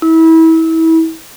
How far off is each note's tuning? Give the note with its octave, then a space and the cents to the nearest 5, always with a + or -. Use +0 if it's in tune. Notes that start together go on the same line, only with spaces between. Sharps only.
E4 -30